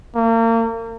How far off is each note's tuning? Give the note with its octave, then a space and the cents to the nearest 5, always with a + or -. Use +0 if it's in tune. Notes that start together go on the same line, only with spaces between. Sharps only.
A#3 -35